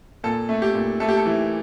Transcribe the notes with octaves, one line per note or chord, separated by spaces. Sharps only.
A#2 A4
A3
G4
A#2
A3 A4
G4
A4
E3